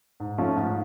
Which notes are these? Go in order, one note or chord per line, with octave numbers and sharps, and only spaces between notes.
G#2
F3 A3 C#4
G#2